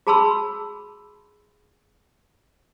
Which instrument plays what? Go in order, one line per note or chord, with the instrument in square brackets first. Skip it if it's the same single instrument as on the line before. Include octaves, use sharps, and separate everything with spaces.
[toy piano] F#4 G#4 A5 B5 C6 E6